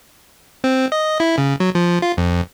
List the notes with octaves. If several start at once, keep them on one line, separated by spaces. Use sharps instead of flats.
C4
D#5
E4
C#3
F#3
F3
F4
F2